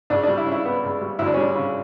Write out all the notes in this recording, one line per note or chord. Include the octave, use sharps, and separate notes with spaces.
C#2 D4
G3 D4
E4
C#3
E4
B3
C#2
G3
D2 E4
D4
C#4
G3 D4
C#3